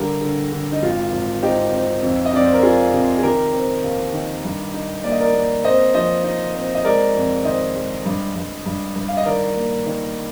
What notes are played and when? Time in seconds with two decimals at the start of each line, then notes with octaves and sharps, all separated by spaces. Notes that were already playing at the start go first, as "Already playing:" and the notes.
Already playing: G2 D3 G4 A#4
0.22 D3
0.52 D3
0.72 D#4
0.82 G#1 F4
1.12 G#1
1.42 C4 D#4 G4
1.73 C4
2.02 F2
2.26 D#5
2.33 F2 D5
2.45 C5
2.54 A#4
2.63 F3 F4 G#4
2.93 C3
3.18 G#4
3.23 D#3 G4 A#4
3.53 C4
3.84 D#2
4.14 D#3
4.44 G2
4.74 D#4
5.04 A#3 D5
5.12 D#5
5.20 A#4 D5
5.34 A#3
5.64 C4 C5 D#5
5.94 F3 C5 D#5
6.24 D#4
6.55 C4
6.75 D#5
6.85 G#3 A#4 D5
7.15 F2
7.45 D#3 C5 D#5
7.76 G#3
8.05 G2
8.36 G2
8.66 G2
8.96 G2
9.08 F5
9.17 D#5
9.26 D#3 A#4 D5
9.56 A#3
9.87 D#3